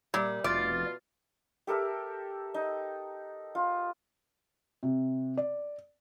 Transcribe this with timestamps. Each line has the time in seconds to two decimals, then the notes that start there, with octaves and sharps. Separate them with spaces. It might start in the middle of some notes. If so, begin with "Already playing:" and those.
0.14 A#2 G3
0.44 F1 B2 F4 D5
1.67 G4 A4 A#4 E5
2.54 D#4
3.55 F4
4.83 C3
5.37 D5